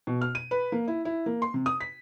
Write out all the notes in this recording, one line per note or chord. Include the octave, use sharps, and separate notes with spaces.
B2
F6
D#7
B4
A#3
E4
E4
A#3
C6
C3
D#6
B6